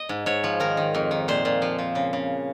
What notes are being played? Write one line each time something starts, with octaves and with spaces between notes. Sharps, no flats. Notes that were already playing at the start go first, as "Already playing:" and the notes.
Already playing: D#5
G#2
G#2 C#5
F3
D#3 A#4
D#3
F2
D#3
A#2 C5
A#2
F3
F3
C#3
C#3